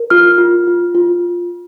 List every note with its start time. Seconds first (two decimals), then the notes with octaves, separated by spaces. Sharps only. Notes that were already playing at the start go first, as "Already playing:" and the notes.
Already playing: A#4
0.10 F4 F6
0.38 F4
0.67 F4
0.95 F4